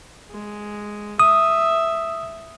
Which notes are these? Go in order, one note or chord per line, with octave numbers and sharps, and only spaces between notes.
G#3
E5 D#6